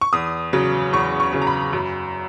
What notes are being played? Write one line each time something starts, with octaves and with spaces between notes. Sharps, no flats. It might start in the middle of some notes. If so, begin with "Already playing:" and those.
C#6
E2 D#6
C#3 F#3
E2 C#6
C#6
C#3 F#3
A#5
B5
F#2